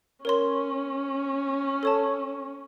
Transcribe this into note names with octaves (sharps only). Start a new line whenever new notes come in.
C#4 A#4 C#5 C6
A4 C#5 A5